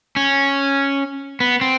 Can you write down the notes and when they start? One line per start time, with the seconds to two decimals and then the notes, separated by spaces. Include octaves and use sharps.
0.16 C#4
1.40 B3
1.61 C4